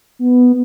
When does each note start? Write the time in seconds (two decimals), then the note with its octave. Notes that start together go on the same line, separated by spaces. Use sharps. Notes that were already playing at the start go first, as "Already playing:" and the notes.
0.19 B3